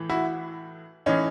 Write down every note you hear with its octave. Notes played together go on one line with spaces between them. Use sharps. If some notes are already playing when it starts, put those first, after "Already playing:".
Already playing: A2 E3
E4 F#4
A2 E3 C#4 D#4